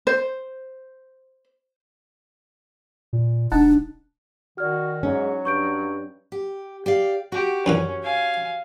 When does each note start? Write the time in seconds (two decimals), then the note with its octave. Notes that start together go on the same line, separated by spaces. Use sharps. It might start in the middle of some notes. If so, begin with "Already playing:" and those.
0.07 C5
3.13 A#2
3.52 E1 D4 D#4 F#5 A5
4.58 D#3 F#4 D5 F6
5.03 G#2 F#3 C#4
5.45 G2 C#6 G6 D7
6.32 G4
6.86 G4 D5 F5
7.32 F#4 G4
7.66 F#2 A#2 E3 C#4
8.03 F5 G#5